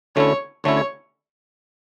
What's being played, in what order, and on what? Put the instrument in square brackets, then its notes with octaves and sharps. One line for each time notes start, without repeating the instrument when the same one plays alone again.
[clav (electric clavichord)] D2 D3 A3 C#4 E4 [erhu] C#5
[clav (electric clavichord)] D2 D3 A3 C#4 E4 [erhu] C#5